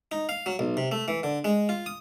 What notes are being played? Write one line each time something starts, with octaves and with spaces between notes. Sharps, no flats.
D#4
F5
F#3
B1
C3
A3
E3
D3
G#3
F4
D#6